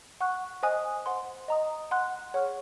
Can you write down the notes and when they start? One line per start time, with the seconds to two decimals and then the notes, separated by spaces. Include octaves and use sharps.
0.21 F#5 C#6 F#6
0.63 C5 D#5 G#5 D#6 F#6
1.06 C5 F#5 C6
1.48 D#5 A#5 D#6
1.91 F#5 C6 F#6
2.34 G#4 C#5 F#5 C#6 F6